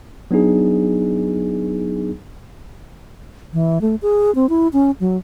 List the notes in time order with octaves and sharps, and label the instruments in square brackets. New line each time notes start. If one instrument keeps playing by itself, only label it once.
[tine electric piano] F#3 B3 D4 D#4 G#4
[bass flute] E3
A3
G#4
C4
E4
C#4
F#3